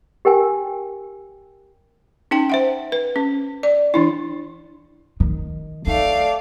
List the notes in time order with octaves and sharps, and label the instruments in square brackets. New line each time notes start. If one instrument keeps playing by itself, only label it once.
[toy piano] G4 A#4 G5 G#5
[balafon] C#4 D#4 G5 A5
C5 E5 F#5
B4
C#4
D5
E3 D4 E4
[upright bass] D#3
[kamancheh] A3 D5 [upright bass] D#4 [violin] F5